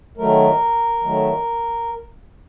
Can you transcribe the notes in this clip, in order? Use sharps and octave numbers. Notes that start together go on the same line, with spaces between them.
D#3 F#3 A3 A#4
D#3 F#3 A3